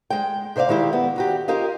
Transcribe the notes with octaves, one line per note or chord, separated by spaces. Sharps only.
G#3 G5
C3 C5 D5 D#5 F5
D#3 G#3 E4 G4
B3
D#3 F#4 G4
F4 G4 A#4 D#5 F5